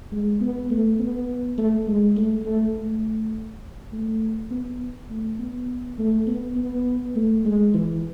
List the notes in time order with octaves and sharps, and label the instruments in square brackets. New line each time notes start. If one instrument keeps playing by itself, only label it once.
[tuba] G#3
B3
A3
B3
A3
G#3
A3
A3
A3
A3
B3
A3
B3
A3
B3
B3
A3
G#3
E3